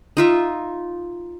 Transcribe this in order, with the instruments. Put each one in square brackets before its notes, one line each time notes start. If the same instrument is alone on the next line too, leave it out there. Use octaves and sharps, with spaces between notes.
[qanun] D#4 F4 E5